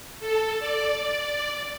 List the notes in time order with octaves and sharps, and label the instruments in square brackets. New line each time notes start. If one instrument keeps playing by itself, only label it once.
[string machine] A4
D5